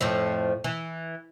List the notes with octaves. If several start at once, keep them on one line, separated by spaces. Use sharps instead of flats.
F2 A2 F3
E3